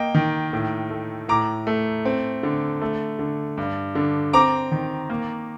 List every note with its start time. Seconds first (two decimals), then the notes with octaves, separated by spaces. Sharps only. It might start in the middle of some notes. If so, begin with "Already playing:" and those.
Already playing: A#3 D#5 G5
0.15 D#3
0.53 A2
0.90 A3
1.29 A2 A#5 D6
1.67 A3
2.05 C4
2.43 D3
2.81 A3
3.19 D3
3.57 G2
3.95 D3
4.33 C4 A#5 D6
4.72 D#3
5.10 A#3